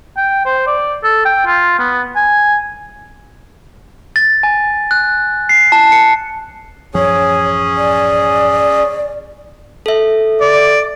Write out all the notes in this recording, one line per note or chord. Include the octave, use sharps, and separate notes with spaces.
G5
C5
D5
A4
G5
F4
B3
G#5
A6
G#5
F#6
C7
A5
C#7
A1 F#2 F3 C#4 G#4 C#5
D5
A4 E5
D5